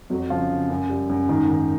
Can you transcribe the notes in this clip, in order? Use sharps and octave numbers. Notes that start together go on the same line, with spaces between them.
F2 F#3 F#4
C#3 F3 F4
C#3
F#2
G3
F#2
G#2 D#3 D#4
D#3